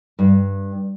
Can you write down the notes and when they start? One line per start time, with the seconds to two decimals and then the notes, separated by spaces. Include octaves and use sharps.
0.19 G2